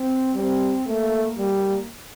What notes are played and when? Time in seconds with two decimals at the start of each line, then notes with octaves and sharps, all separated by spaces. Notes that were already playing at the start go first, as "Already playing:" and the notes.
Already playing: C4
0.34 G3 C4
0.86 A3 A#3
1.37 G3 A#3